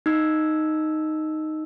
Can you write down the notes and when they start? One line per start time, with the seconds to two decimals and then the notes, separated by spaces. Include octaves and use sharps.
0.06 D#4 E6